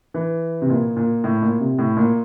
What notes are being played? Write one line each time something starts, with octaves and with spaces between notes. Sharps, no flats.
E3
C3
A#2
A#2
A2
A#2
C3
A2
A#2